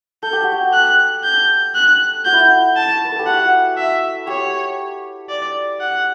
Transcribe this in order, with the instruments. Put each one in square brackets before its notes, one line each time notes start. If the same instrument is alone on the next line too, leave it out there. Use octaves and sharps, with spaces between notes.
[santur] A4 [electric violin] G6
[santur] G4
F#4
G4
[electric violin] F#6
G6
F#6
[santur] F#4 [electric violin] G6
[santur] E4
F#4
[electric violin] A5
[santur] B4
A4
G4
[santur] F#4 [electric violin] F#5
[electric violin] E5
[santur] G4 [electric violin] C#5
[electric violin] D5
F#5